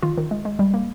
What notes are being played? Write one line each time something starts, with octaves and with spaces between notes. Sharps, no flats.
D#3 F4
D#3
G#3
G#3
G3
A#3